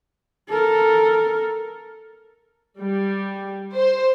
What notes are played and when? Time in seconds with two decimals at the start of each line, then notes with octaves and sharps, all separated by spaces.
0.49 A4 A#4
2.80 G3
3.75 C5